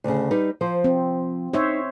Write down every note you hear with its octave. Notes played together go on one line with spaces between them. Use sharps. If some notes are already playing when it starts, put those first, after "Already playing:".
D2 C#3
G3 D#4 B4
F3 C5
C4
D#4 C5 C#5 E5